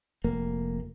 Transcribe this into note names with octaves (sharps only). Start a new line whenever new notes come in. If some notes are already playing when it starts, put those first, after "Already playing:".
F1 A#3